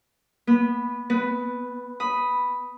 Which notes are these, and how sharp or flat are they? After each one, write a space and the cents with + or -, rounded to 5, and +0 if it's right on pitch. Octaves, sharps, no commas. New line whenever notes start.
B3 -25 B5 +0
B3 +25 B4 +0
B5 +0 D#6 +0